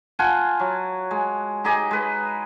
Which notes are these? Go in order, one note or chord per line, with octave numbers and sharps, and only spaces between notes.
F4 F#5 G#5 A5
F#3
G#3
D#4 G4 G#4 D#5
G#3 B4